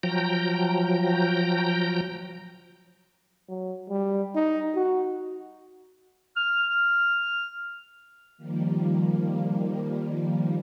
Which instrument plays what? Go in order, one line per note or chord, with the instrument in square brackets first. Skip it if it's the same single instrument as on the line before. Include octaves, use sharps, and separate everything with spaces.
[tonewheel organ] F3 F#3 G5 A#5
[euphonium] F#3
G3
D#4
F#4
[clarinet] F6
[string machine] D#3 F3 G3 A#3